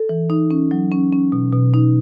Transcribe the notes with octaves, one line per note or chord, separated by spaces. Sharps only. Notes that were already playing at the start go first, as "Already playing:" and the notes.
Already playing: A4
E3
D#4
C#4
F#3
C#4
C#4
B2
B2
D#4